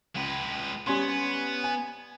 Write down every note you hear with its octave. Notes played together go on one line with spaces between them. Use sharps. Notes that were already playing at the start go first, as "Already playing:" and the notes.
C#2 G#3 B4
G3 B3 C#4 C6
G#5